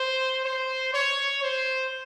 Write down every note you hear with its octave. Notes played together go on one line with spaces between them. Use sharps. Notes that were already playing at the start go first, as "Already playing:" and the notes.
Already playing: C5
C5
C#5
C5